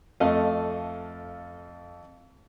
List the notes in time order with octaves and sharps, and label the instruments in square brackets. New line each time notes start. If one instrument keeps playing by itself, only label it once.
[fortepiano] F2 A3 D#5 F5